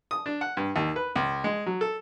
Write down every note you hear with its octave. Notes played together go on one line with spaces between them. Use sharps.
D#6
D4
F#5
G2
D#2
B4
C#2
G#3
F#3
A4